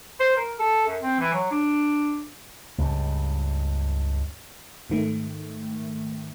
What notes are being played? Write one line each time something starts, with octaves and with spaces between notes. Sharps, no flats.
C5
A#4
A4
F#2
C4
E3
F#3
D4
C#2 G2
G#2 D#3 A3